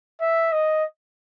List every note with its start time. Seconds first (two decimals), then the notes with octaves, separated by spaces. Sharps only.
0.21 E5
0.52 D#5